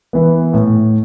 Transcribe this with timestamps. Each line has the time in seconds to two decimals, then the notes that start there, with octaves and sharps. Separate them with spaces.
0.13 E3 B3
0.53 A2